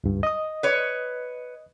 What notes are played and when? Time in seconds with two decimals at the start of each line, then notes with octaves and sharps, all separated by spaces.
0.04 C#2 G2
0.23 D#5 D#6
0.63 B4 C#5